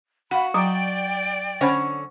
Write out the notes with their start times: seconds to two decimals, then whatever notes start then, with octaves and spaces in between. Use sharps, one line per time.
0.31 F#4 F5 F#5 B5
0.54 F#3 D5 G5 A#5 D6
1.61 D3 C#4 C5 C#5 F#5 B5